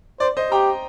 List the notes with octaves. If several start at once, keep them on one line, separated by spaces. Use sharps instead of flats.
C5 D5
C5 D#5
G4 G5 A#5